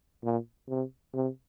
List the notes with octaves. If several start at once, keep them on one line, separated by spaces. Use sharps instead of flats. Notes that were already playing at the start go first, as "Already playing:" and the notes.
A#2
C3
C3